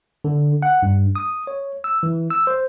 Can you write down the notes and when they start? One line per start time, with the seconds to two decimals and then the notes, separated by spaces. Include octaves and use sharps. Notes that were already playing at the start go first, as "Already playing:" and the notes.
0.25 D3
0.62 F#5
0.82 G2
1.16 D#6
1.47 C#5
1.84 E6
2.03 E3
2.31 E6
2.47 C5